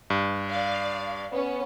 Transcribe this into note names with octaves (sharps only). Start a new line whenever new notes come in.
G2
D5 F5
B3 C#4